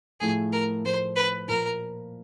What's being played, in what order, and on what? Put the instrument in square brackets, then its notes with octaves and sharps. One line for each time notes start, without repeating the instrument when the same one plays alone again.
[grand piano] A2 F3 A3 [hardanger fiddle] G#4
[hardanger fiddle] A#4
[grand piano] A2 F3 A3 [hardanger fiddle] C5
[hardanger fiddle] B4
[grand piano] A#2 F3 A#3 [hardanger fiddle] A#4